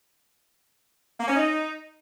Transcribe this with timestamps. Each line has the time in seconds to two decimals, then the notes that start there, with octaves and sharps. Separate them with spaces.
1.20 A#3
1.28 C#4
1.36 D#4